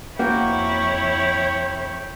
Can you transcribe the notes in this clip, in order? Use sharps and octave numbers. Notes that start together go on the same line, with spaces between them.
F2 A#3 E4 F#4 C#5 G5